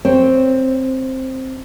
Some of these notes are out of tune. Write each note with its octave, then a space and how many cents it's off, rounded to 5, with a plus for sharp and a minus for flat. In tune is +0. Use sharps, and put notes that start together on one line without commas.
C4 +5 C#5 +0